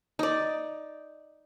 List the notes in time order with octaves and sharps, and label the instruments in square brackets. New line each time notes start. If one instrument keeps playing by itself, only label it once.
[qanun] D#4 D5